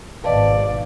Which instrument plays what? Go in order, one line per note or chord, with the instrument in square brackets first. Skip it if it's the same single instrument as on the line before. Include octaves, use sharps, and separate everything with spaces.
[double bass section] G#1 B2 [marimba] B4 D#5 A5 [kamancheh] D5 [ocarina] F5